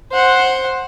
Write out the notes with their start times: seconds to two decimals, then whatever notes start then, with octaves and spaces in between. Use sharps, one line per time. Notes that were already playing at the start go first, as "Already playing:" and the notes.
0.12 C5 F#5